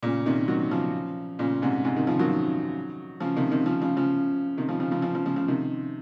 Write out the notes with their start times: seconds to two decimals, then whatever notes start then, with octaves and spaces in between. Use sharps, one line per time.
0.03 A#2 C#3
0.26 C3 D#3
0.48 D#3 F#3
0.71 C#3 F3
1.39 A#2 C#3
1.62 G#2 C3
1.85 G#2 C3
1.96 C3 D#3
2.07 C#3 F3
2.19 D#3 F#3
3.20 C#3 F3
3.36 C3 D#3
3.51 C3 D#3
3.66 C#3 F3
3.82 C#3 F3
3.97 C#3 F3
4.58 C3 D#3
4.69 C#3 F3
4.80 C#3 F3
4.91 C#3 F3
5.02 C#3 F3
5.14 C#3 F3
5.26 C#3 F3
5.36 C#3 F3
5.48 C3 D#3